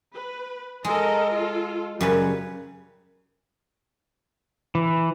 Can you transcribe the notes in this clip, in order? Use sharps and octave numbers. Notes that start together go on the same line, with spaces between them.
B4
G#3 A4 A#4 D#5
F4 A4
F#2 C#3 G3 B4
E3